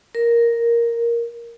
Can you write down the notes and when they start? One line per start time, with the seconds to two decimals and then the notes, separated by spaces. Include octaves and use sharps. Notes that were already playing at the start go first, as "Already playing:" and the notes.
0.15 A#4